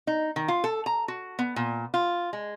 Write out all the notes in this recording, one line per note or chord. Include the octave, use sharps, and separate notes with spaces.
D#4
D#3
F4
A4
A#5
F#4
B3
A#2
F4
G#3